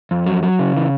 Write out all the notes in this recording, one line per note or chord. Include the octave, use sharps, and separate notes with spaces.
F2
F#3
F#3
C#3
E3